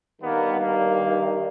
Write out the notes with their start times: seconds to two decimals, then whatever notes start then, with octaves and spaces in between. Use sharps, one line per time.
0.21 G2 D#3 G3 A#3 B3
0.58 A#3